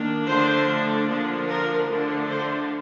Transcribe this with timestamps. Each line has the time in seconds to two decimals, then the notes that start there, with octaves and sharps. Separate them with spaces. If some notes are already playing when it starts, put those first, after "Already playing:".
Already playing: D#3 A#3 D4
0.27 D3 F3 A3 D4 C5
1.08 D3 F3 A#3 D4
1.47 A#4
1.89 D3 F3 A3 D4
2.29 C5